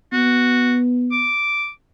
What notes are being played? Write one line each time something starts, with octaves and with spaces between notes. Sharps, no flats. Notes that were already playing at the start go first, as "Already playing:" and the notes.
B3 F#4
D6